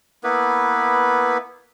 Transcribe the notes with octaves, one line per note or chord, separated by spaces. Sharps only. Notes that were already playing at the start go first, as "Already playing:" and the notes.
A#3 B3 E4 B4